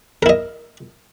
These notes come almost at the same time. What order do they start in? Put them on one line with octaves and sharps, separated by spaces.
A#4 E4 D#5